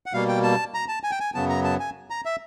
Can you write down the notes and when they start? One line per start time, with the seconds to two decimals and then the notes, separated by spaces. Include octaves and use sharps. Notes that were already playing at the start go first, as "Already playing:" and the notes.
0.06 F#5
0.13 B2 G3 A#3 F5
0.28 G5
0.43 A5
0.74 A#5
0.88 A5
1.03 G#5
1.11 G5
1.20 G#5
1.34 F#2 C#3 F#3 B3 A5
1.49 A#5
1.64 A5
1.80 G#5
2.10 A#5
2.25 E5